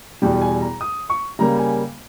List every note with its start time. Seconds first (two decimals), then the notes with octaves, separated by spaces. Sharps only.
0.22 E2 B2 G3 G5
0.42 G#5
0.61 A#5
0.81 D#6
1.10 C#6
1.39 C#3 G3 A#3 A#5
1.59 G#5